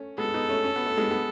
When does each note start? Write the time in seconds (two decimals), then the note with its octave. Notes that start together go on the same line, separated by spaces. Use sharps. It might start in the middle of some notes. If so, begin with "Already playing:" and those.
Already playing: A3 C#4
0.18 G#3 B3 A4
0.34 B3 D#4
0.49 A3 C#4
0.64 C#4
0.76 B3
0.86 A3
0.97 G#3 B3
1.11 G#3 B3